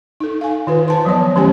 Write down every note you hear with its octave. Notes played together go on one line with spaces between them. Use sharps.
D#4 A4
F5 G#5
D#3 F4 B4
C5 A5 C6
F3 F#3 B3 C#5
D#3 A3 C#4 G4 C5 G#5